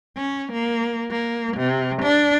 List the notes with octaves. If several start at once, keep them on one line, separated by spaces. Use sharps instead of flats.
C#4
A#3
A#3
C3
D4